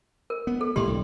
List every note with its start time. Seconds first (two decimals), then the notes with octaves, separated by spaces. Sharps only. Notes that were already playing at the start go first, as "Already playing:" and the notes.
0.30 A#4
0.47 B3
0.61 A4
0.76 A2 D3 G#3 G4 C6
0.87 B1 G2